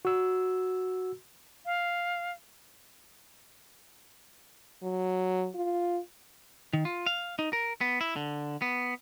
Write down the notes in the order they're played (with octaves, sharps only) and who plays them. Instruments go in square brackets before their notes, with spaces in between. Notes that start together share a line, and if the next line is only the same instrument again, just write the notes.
[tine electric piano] F#4 E6
[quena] F5
[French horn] F#3
F4
[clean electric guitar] D#3
F4
F5
D#4
A#4
B3
E4
D3
B3